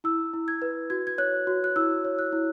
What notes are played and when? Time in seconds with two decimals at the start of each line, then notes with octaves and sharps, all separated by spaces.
0.04 E4 E6
0.34 E4
0.48 G#6
0.62 B4
0.90 F#4 G#6
1.07 G#6
1.18 C#5 F#6
1.47 F#4
1.64 F#6
1.76 E4 E6
2.05 C#5
2.19 F#6
2.32 E4